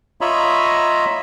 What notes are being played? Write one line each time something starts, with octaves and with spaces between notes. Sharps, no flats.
F4 C#5 D#5 E5 A#5 B5